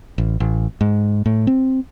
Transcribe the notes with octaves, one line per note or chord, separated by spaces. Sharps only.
A1
A1
G#2
A2
C4